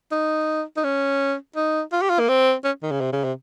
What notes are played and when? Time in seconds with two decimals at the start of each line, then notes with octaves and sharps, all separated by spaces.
0.12 D#4
0.77 D#4
0.84 C#4
1.56 D#4
1.92 F4
2.02 G4
2.10 F4
2.19 A#3
2.29 C4
2.65 C#4
2.83 D#3
2.92 C#3
3.01 C3
3.13 C#3
3.24 C3